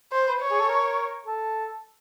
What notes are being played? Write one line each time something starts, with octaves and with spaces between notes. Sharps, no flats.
C5
B4
C#5
G#4
A4
A#4
A4